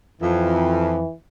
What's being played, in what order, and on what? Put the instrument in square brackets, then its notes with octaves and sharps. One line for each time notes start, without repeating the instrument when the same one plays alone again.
[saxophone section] F2 [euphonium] E3